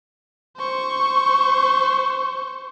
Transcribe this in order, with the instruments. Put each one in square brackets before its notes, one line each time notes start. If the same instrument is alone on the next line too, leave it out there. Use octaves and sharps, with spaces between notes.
[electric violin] C5 C#6